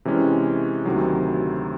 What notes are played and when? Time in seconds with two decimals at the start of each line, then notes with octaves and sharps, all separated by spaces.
0.05 C3 E3 G#3 C#4
0.85 D2 C3 D#3 F#3